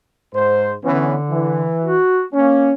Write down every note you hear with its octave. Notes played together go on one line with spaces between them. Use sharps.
G#2 C5
D3 E3 B3 C#4
E3
F#4
A#3 C#4